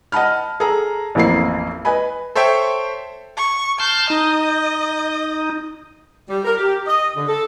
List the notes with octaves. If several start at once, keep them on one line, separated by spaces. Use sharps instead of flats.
D#5 F#5 A5 B5 F6
G#4 A4 A#5
A1 F2 A#3 B5 C7
B4 D#5 G#5 B5
A4 C5 C#5 E5 G5
C#6
A5 C6 F6 G6
D#4 D#5
G3
A#4
G4
D#5
D3
A4